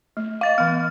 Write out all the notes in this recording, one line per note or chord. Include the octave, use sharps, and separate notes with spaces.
A3
D#5 F5 D6 A6
E3 B3 F6